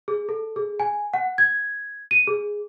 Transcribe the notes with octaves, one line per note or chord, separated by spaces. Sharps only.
G#4
A4
G#4
G#5
F#5
G#6
D#7
G#4